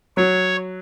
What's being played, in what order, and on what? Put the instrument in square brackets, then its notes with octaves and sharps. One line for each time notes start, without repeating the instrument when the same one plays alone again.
[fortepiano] F#3 [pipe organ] C#5